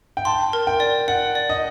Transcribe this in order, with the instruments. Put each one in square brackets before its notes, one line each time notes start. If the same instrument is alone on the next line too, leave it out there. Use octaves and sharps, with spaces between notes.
[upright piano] G5
[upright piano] A5 [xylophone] C6
[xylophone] A#4
[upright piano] G5
[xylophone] D5
[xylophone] D5 [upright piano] F#5
[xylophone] D5
[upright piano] D#5